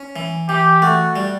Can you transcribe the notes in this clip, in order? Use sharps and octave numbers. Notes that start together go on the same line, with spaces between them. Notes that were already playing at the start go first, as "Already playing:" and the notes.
Already playing: C#4
E3
E3 G4
A3 F#4
G3